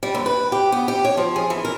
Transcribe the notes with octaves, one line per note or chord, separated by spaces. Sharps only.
G3
D#2
B4
G4
B3
G4
C#5
F3
G#4
E3
A#4